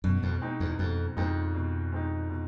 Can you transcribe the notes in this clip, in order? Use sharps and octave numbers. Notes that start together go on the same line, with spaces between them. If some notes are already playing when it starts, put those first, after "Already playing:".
F#2 B2
F2
G#3 C4 D#4
E2
F2 B2
F2 G#3 C4 D#4
B2
G#3 C4 D#4
B2